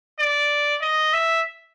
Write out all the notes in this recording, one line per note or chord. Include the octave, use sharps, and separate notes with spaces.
D5
D#5
E5